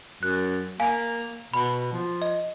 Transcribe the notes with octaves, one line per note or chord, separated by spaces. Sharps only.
F#2 F#6
A#3 F5 G#5
B2 B5
F3
D#5